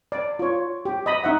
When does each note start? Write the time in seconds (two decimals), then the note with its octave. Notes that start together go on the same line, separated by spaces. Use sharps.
0.12 D5
0.39 F4 C#5
0.85 G4
1.06 D#5 B5
1.24 D#4 E5 F#5